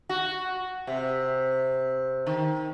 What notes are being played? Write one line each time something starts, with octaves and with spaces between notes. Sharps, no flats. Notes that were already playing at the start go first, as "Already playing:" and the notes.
F#4
C3
D#3